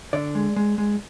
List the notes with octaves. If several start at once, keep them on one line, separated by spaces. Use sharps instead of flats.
D3 D5
G#3
G#3
G#3